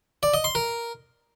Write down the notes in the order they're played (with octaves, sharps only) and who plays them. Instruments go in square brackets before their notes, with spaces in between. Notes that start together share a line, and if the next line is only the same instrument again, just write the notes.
[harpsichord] D5
D#5
C6
A#4